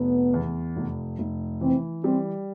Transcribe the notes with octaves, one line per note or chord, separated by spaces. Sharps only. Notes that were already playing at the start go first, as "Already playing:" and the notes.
Already playing: F1 B3
E2
F1
F1
E3 C4
G3 C4